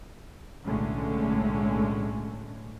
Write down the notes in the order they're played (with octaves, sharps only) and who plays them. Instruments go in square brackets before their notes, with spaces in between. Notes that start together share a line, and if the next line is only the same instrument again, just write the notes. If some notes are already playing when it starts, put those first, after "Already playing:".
[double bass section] B1 A2 D3 G#3 A3 C#4